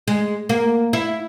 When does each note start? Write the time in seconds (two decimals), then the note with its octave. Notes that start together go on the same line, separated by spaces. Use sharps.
0.08 G#3
0.49 A#3
0.93 E4